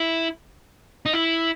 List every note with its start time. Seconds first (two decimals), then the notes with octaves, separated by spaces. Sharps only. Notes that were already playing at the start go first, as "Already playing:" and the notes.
Already playing: E4
1.06 D#4
1.13 E4